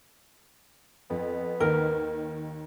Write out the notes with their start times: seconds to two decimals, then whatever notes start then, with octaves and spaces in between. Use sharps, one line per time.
1.10 F2 B3
1.60 D#2 D#3 A#4